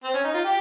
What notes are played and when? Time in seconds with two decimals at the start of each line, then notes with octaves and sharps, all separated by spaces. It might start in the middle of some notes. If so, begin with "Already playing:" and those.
0.04 C4
0.14 C#4
0.24 D#4
0.34 F4
0.44 G4